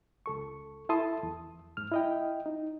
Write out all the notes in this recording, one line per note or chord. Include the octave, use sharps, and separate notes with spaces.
C#2 A4 C#6
E4 A4 A5 C6 D#6
E2
G#2 F6
E4 D#5 G5
D#4